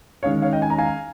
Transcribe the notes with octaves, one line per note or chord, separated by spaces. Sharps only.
D#3 G#3 C#4 C#5 F5
C#5 F5
D#5 G5
G#5
A#5
F5 G#5